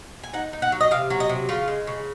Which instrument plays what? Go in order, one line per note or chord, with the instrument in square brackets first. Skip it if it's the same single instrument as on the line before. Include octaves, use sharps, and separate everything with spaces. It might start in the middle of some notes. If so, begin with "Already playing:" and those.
[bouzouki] G#5
D#4 F#5
D#4
F#5
F#3
D#5
C3 F5
F#3
D#5
C3
C#3 F4
G#3
C#3